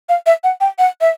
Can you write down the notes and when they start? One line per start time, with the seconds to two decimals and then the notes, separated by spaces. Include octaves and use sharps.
0.09 F5
0.26 E5
0.44 F#5
0.61 G5
0.79 F#5
1.01 E5